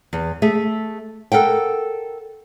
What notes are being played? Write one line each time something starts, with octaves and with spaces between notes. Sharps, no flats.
E2
A3 G#4 E5
A4 A#4 F#5 G5